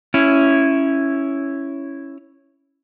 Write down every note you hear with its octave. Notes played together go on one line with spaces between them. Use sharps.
C#4 E4